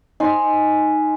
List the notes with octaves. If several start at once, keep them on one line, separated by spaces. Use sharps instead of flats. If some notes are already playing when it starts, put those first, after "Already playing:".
D#4 G#5 C6